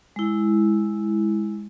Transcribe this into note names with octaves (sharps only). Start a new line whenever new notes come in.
G#3 E4